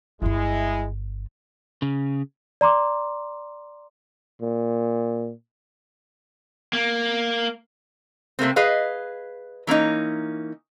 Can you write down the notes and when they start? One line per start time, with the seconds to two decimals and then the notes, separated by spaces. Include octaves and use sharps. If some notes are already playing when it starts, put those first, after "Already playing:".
0.22 G1 G#3 E4 F4
1.82 C#3
2.61 D5 A#5 C6 D6
4.41 A#2
6.73 A#3
8.39 C3 A3 A#3 C4
8.56 G#4 B4 D#5 F5
9.67 E3 A#3 C#4 D#4